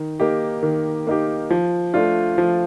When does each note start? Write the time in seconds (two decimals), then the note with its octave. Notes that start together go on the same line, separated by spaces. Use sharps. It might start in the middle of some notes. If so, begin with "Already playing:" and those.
Already playing: D#3
0.20 A#3 D#4 G4
0.63 D#3
1.07 A#3 D#4 G4
1.50 F3
1.94 A3 D4 F4
2.38 F3